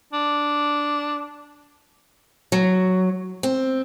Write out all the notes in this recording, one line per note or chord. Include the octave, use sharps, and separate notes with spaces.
D4
F#3
C4